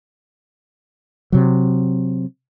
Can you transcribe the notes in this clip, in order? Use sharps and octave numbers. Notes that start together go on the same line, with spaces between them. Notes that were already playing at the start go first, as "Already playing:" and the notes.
C3 F#3